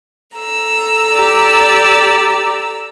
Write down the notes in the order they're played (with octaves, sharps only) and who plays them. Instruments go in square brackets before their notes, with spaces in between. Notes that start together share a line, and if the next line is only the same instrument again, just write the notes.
[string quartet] A4 A#5 E6
[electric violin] G4 D5